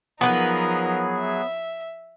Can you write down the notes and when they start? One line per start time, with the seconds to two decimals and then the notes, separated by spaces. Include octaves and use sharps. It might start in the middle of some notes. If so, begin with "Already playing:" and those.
0.21 F3 F#3 B3 D#4 G#4 A#4 B4
1.18 E5